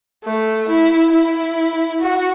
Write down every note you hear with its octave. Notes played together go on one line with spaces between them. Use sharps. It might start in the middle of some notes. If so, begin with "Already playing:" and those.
A3
E4
E4
F#4